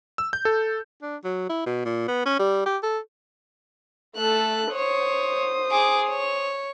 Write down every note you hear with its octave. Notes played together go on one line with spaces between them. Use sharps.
E6
G6
A4
D4
F#3
E4
B2
A#2
B3
C#4
G3
G4
A4
A3 A4 F#6
C5 C#5 D#6
G#4 D6
C#5